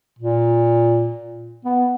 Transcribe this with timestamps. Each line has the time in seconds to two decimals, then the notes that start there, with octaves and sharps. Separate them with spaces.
0.19 A#2
1.65 B3